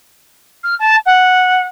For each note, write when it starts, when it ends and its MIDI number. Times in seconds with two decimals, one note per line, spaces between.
0.63 0.75 89
0.79 0.96 81
1.06 1.66 78